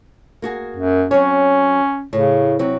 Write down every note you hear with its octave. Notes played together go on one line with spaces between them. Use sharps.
A#3 F#4 G#4
F#2
F#3 C4 C#4 C#5
A2 C#3
C3 F#3 C4